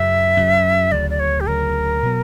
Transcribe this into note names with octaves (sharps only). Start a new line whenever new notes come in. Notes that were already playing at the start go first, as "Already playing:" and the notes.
Already playing: F#2 C#3 F#3 E5
F#2 C#3 F#3
D2 C#3 F#3 D5
D5
C#5
G4
D2 C#3 F#3 A#4
B2 F#3 B3